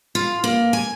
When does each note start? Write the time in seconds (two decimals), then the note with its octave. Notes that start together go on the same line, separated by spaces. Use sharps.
0.15 F4
0.44 A#3
0.73 G#5